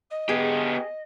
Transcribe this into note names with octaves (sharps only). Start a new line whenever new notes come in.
D#5
B3 G4 G#4